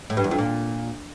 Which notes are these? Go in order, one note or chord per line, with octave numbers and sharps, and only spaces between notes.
A2
G2
E2
F2
A#2